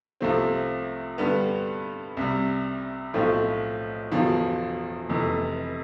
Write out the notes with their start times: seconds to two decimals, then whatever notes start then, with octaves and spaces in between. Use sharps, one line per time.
0.21 C2 C3 F3 A3 C4
1.18 G2 D3 G3 B3
2.17 C2 C3 G3
3.14 B1 A2 F3 A3 C4
4.12 E1 E2 D3 F3
5.09 F1 F2 C3 E3 A3